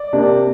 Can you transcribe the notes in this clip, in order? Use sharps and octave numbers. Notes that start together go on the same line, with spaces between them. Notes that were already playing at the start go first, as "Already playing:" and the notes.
Already playing: D5
C3 A#3 D4